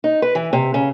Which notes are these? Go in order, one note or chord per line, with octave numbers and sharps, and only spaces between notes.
D#4
B4
E3
C3
C#3